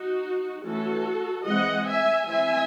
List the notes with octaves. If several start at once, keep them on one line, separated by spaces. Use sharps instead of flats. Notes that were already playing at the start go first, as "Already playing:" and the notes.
Already playing: D#4 F#4
E3 A3 C#4 F#4 A4
E3 G#3 C4 D#5 F#5
E5 G#5
E3 C4 E5 G#5